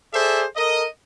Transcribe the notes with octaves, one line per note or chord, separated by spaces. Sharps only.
G#4 A4 C5 D5 E5
A4 A#4 D#5